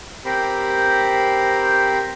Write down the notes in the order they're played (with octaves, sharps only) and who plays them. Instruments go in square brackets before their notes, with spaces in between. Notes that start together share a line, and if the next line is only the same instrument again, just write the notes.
[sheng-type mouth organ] C4 G4 A#4 C5 B5